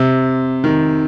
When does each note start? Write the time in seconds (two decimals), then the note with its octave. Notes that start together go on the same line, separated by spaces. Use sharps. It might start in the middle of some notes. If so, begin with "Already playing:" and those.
Already playing: C3
0.64 D#3